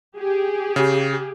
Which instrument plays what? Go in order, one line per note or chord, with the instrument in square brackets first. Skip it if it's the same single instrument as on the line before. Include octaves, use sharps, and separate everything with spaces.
[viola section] G4 G#4
[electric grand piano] C#3